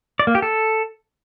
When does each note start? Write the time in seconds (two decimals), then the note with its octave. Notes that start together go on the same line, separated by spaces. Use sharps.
0.20 D5
0.27 A#3
0.35 G4
0.42 A4